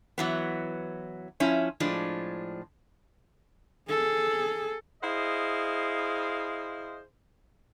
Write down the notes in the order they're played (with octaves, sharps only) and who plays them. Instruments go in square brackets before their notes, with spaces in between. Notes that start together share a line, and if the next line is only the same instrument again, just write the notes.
[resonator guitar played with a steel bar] E3 F#3 B3
F3 C#4 E4
A2 F3 G#3 D4
[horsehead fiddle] G#4 A4
[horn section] E4 G#4 C5 D#5 F5